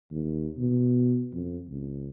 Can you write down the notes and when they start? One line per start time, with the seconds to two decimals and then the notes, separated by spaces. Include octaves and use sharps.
0.11 D#2
0.58 B2
1.33 F2
1.68 C#2